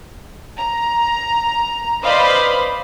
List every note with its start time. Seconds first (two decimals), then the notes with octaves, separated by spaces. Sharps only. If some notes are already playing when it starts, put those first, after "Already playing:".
0.58 A#5
2.04 B4 C5 D5 D#5 F5 B5